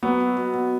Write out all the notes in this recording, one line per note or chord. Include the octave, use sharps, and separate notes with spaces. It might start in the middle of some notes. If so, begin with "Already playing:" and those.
F#3 B3
B2
B2
B2